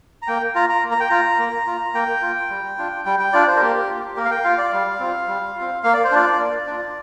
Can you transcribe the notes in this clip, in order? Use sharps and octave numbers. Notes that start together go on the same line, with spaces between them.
A#5
A#3 G5
F4 A#5
A#5
A#3
A#5
G5
F4 A#5
A#3
F4
A#3 G5
F4
G3
D4 F4
G3 G5
G5
D4 F4 D5
C5
A#4
A#3 G4
F4
A#3 A#4
F5
G5
F4 F5
D5
G3 F5
C4 F4
G3
F4
C4
A#3 F5
D5
C5
D4 F4 D5
A#3
D4 F4